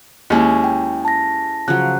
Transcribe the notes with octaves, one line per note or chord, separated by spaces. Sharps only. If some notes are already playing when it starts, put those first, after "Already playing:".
D#2 G#3 C#4 E4
G5
A5 A#6
C#3 F3 F#3 F#6